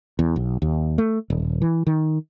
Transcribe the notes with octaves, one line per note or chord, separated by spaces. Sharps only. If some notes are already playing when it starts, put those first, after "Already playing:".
E2
B1
D#2
A3
D#1
E3
D#3